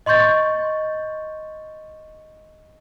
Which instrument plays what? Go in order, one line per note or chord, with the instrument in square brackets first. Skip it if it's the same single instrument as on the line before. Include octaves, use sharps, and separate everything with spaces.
[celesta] D#5 C6 C#6 G6 A6